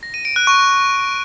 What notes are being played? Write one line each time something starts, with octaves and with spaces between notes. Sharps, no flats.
A#6
D#7
D7
F#6
C#6